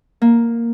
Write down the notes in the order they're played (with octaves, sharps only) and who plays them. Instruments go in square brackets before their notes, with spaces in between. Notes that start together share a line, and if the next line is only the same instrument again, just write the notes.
[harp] A#3